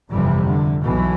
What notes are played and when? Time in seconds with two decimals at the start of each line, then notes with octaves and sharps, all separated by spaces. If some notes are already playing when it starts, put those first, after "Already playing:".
0.11 G1 F2 C3 E3 G3
0.46 D3
0.82 B1 B2 E3